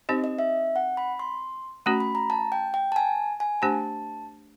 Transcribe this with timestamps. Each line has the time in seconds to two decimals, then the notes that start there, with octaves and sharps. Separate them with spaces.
0.09 C4 D#4 G4 C5 D#5
0.24 D#5
0.39 E5
0.76 F#5
0.97 B5
1.19 C6
1.86 A3 C#4 F#4 B5
2.00 B5
2.15 A#5
2.30 A5
2.52 G5
2.74 G5
2.92 A5
2.96 G#5
3.40 G#5
3.62 A3 D4 G4 C5 A5